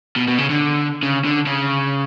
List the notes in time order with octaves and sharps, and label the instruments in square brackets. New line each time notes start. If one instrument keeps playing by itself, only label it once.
[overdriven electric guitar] B2
B2
C#3
D3
C#3
D3
C#3